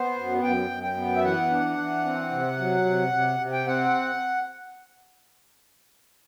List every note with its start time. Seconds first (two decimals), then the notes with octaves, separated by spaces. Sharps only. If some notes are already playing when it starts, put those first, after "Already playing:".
Already playing: B3 C5
0.16 F#2
0.43 F#2 G5
0.70 F#2
0.83 G5
0.97 B3
1.16 E5
1.23 E3 F#5
1.50 D4
1.78 E3
2.04 C4
2.31 C3
2.58 F#3
2.85 C3
3.13 C3
3.40 C3
3.52 G5
3.66 C4 F#5